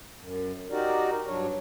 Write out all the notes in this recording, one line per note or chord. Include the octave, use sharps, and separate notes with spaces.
F#2
D#4 F#4 G4 A#4 D5
G2 F#3 D4 C#5